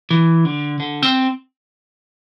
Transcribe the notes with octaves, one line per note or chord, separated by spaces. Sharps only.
E3
D3
D3
C4